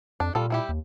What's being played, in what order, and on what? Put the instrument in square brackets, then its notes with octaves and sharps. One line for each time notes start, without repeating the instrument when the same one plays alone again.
[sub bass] F2 [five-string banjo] D4
[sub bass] A#2 [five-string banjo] G3 F4 A4
[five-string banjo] G3 E4 G4
[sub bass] D#2